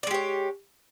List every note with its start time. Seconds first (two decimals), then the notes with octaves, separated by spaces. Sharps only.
0.03 D5
0.07 G#3
0.11 G4
0.14 C#5